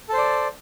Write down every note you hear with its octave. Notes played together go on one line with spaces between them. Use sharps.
A4 C5 D5